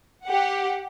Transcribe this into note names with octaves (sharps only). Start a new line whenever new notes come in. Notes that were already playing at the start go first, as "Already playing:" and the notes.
G4 F#5